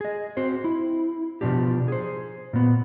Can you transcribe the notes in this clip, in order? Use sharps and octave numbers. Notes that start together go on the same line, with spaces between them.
G#4 D#5
C4 F#4 C5
E4
B2 E3 F3 D4 G4
G#4 C5
A#2 B3